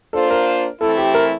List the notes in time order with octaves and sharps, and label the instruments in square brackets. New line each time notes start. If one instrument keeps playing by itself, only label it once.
[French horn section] A#3 D4 F4 C5 [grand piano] A4
[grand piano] A#4
[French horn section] E3 A3 C4 E4 [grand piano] A4
[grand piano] G4
A#4